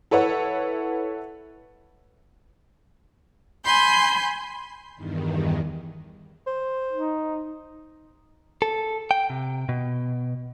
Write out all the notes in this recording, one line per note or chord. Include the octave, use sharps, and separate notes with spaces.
E4 A4 B4 C#5 F#5
G#5 B5 C6 G6
E2 G2 D#3
C5
D#4
A4
G5
C3
B2